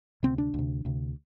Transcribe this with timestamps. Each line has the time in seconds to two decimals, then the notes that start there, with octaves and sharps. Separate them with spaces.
0.23 D2 C3 C4
0.38 D4
0.54 D2 C3
0.85 D2 C3